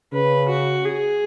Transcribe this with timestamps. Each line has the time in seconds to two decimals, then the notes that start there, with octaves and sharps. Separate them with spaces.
0.13 C#3 B4
0.49 F#4
0.85 G#4